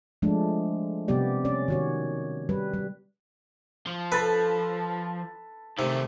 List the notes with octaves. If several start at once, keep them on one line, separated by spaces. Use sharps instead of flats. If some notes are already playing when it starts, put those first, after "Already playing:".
F3 G#3 A3 D4
C3 G3 B3 G4 D5
C#4 D5
D#3 F#4 C#5
G3 B4
G3
F3
A4 B4 A5 B5
C3 D#3 A3